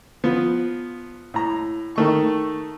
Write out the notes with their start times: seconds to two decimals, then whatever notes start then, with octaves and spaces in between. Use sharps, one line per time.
0.24 F3 B3
1.34 A2 A#5
1.96 D#3 A3 C#6